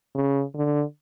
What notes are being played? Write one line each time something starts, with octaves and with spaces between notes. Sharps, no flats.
C#3
D3